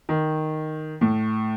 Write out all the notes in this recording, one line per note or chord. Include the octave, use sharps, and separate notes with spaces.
D#3
A2